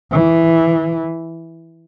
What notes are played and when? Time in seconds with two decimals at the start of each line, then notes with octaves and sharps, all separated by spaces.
0.12 E3